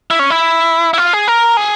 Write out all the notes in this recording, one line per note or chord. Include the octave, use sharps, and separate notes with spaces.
E4
C#4
E4
E4
F4
G#4
A#4
G#4